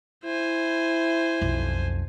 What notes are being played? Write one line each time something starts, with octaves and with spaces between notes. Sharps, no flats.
E4 C5 G#5
B1 F2